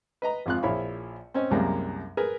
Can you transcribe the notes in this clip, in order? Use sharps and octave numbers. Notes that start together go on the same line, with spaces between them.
B4 D#5 A#5
G#1 F2 F4 F5 F#6
A#1 F3 E4 C#5 F5 B5
C4 C#4 D#5
C2 F#2 G3 G#3 A#3
G#4 A#4 B4